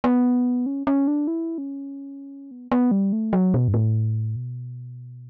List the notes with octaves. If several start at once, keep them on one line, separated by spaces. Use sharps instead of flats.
B3
C#4
C#4
D4
E4
C#4
B3
B3
G3
A3
F#3
B2
G2
A2
B2